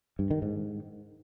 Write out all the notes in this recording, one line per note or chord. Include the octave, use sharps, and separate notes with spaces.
G2
D#3
G#2